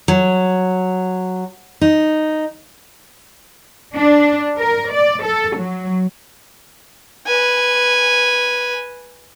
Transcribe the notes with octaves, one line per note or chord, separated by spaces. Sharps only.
F#3
D#4
D4
A#4
D5
A4
F#3
B4 G#5